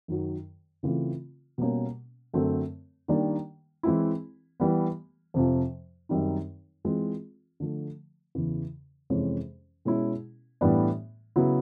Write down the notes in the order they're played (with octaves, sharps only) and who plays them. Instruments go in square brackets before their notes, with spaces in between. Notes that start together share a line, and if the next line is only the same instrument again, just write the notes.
[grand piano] F#2 D#3 F#3
C#3 E3 A3 C4 F4
B2 G3 A#3 C#4
F#2 D3 F#3 A3 C4
D#3 G3 A#3 D4
E3 G#3 C4 E4
E3 G3 B3
F2 C3 F3
F#2 D#3 G3 C4 D#4
E3 G#3 C4 F4
D3 F3 A3
E2 C#3 E3
F2 C3 E3 G#3 C#4
B2 G#3 C#4 E4
A2 E3 G3 B3 D4
C#3 F#3 B3 E4